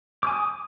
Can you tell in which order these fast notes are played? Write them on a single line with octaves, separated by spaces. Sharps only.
D6 G#5 D#6